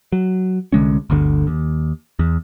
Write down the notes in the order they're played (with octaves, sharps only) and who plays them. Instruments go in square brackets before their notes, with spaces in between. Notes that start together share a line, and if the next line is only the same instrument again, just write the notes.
[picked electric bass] F#3
C2 D3 G#3 C#4
G1 D2 D3
D#2
E2